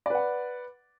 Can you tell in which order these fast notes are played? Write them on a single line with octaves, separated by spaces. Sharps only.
D5 B4 F#5